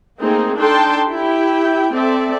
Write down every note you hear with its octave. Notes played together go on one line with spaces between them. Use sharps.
A3 A#3 C4 D#4 G#4
D4 D#4 A4 G5 A5 C6
E4 G4 G5
C4 A4 D5 E5